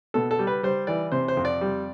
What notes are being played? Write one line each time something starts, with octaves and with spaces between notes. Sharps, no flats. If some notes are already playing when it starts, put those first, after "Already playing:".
B2 A4
A4
G3
B4
G3 C5
E3 D5
C3 C5
C5
F2
D5
G3